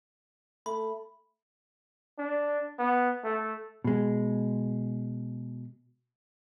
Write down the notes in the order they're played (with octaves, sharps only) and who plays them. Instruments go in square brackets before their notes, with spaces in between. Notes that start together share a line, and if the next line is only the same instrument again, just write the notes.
[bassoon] A3 [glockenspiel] B5
[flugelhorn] D4
B3
A3
[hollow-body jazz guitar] B2 G#3